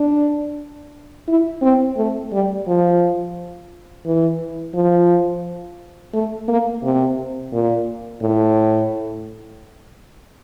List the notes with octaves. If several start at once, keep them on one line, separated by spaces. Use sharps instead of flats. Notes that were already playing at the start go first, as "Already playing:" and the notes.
Already playing: D4
E4
C4
A3
G3
F3
E3
F3
A3
A#3
C3
A#2
A2